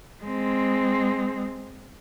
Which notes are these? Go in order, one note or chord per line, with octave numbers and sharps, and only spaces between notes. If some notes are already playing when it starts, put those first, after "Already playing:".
G#3 C4